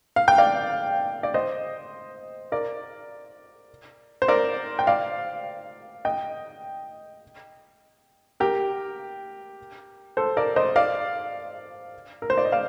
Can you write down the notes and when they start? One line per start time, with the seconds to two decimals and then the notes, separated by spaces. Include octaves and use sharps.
0.16 F5
0.28 G5
0.38 D5 F5
1.23 D5
1.34 C5 D#5
2.52 A#4 D5
4.22 C5
4.28 A#4 D5
4.79 G5
4.87 D5 F5
6.05 D#5 G5
8.40 G4 A#4
10.17 A4 C5
10.37 A#4 D5
10.56 C5 D#5
10.76 D5 F5
12.22 A#4
12.30 C5
12.37 D5
12.45 D#5
12.52 D5 F5